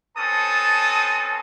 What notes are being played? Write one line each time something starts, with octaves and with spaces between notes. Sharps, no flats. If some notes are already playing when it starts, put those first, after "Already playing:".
C4 C#4 A4 B4 A5 D#6